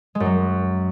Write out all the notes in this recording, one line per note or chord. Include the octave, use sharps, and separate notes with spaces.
G#3
F#2
F#3